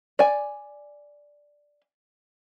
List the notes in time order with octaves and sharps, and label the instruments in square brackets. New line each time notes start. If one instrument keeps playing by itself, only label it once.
[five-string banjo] D5 G#5